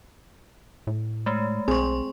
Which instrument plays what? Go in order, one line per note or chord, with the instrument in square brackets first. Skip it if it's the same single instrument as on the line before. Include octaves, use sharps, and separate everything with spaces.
[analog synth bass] A2
[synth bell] G#3 A3
[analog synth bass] B1 [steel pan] C4 G#4 [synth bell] C6 C#6